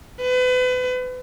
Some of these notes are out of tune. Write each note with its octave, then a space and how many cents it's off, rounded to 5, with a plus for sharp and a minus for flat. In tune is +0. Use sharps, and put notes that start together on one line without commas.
B4 +35